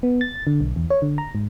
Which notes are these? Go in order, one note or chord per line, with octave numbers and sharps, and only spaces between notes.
B3
A6
D3
B1
E2
C#5
D3
A#5
G#2